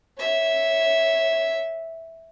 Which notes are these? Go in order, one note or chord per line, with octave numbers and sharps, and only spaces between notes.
C#5 E5